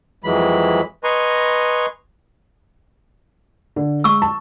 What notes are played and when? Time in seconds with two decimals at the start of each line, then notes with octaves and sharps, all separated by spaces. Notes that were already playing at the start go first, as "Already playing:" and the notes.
0.24 F2 E3 F#3 G#3 B5
1.04 B4 D#5 G#5 A#5 C6 C#6
3.76 D3
4.04 G#3 C#6 E6
4.22 A5